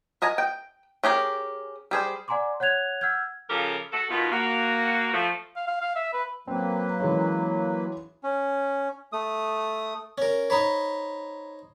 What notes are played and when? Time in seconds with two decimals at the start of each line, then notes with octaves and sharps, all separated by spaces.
0.22 A#4 D#5 G#5 A#5
0.38 G5
1.04 C#4 G4 G#4 A#4
1.91 G3 G#4 C5
2.28 D5 F#5 G#5 A#5 C6 D6
2.60 C#5 F#5 F#6 G#6 F7
3.01 F#5 E6 F6 G6 G#6
3.50 C#3 F3 F4 G4 A4 A#4
3.92 F#4 A4
4.10 B2 D#3 F4
4.31 A#3 F#4
5.14 F3 A3
5.56 F5
5.68 F5
5.81 F5
5.96 E5
6.13 B4
6.47 F#3 A#3 C4 B4
7.00 E3 G#3 C#4
8.23 C#4
9.13 A3 D#6
10.18 C#4 A#4
10.50 D#4 C5 C#5 A#5 B5 B6